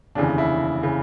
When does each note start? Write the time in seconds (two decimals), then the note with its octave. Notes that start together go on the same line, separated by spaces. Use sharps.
0.15 F1 D#2 C#3 E3 D4
0.38 E4
0.83 C#3 E3